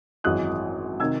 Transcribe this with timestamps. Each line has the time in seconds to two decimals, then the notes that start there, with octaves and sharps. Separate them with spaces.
0.24 G#1 F#2 E3 G#3 D#6 F#6
1.00 C3 D#3 E6 G#6